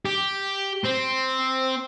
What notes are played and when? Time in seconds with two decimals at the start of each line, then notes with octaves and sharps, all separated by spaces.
0.06 G4
0.85 C4